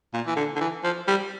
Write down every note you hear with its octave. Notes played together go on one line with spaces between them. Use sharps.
A#2
E3
D3
D3
E3
F3
G3